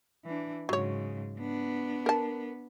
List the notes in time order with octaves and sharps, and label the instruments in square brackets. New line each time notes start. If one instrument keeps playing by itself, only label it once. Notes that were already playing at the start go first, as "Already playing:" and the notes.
[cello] E3 D4
[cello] G#2 C#3 [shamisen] F#3 C#5
[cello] B3 D4
[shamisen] A#4 A5